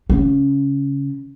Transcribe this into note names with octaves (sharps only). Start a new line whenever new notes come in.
C#3